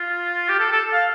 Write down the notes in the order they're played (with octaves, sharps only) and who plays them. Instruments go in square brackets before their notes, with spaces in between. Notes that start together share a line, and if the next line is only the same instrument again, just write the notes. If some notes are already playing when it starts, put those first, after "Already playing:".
Already playing: [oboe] F4
G4
A4
A4
F5